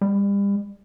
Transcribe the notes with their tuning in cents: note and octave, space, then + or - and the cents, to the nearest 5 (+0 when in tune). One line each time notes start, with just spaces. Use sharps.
G3 +35